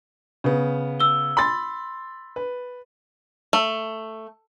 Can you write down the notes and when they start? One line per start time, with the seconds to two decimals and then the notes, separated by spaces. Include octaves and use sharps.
0.44 C#3 B3
1.00 E6 G7
1.37 B5 C6 A6
2.36 B4
3.53 A3